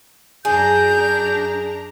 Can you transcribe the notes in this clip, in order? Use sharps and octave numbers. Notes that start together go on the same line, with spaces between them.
F#2 D4 G#4 A#5 G6